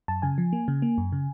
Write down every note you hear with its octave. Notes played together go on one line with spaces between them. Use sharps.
F#2 A5
C#3 G#5
F3
A#3
C#3
A#3
F#2
C#3